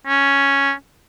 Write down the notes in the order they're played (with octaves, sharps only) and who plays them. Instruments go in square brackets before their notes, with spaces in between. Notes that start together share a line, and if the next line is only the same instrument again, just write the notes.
[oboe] C#4